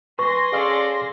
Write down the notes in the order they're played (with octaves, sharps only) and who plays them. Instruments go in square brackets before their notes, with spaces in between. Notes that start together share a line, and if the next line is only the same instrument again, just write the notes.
[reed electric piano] B4 [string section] G#5 C6 A#6 [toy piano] C#6
[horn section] C#4 A4 D5 [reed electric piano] G#4 F5 F6